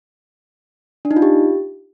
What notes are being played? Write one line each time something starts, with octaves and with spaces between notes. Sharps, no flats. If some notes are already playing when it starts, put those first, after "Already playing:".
D4
D#4
F4
G4